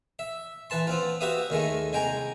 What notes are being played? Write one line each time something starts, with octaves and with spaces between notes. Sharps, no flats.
E5
E3 B4 A5 C6
B3 C4 F4
F#4 G4 B4 E5 F5 D#6
D#2 D#3 G#3 A3
C2 G#3 G5 G#5 A#5